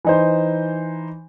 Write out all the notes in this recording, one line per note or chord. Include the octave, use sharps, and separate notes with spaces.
E3 D#4 C5